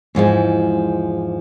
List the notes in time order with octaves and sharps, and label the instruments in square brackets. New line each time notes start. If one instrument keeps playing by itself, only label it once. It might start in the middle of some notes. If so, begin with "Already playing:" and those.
[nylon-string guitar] E2 G#2 F3 G#3